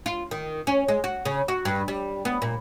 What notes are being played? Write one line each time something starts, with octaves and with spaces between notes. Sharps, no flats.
F4
D#3
C#4
G#3
F#4
C#3
F#4
G2
G3
B3
A#2